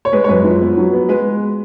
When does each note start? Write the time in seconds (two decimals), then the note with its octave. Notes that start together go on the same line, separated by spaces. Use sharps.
0.05 C#5
0.12 G#3 B4
0.24 C#5
0.28 F#2 B4
0.44 F3
0.61 B3
0.77 F#3
0.94 B3
1.09 G#3 B4